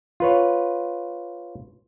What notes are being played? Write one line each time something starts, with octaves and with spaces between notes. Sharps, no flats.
F4 B4 C#5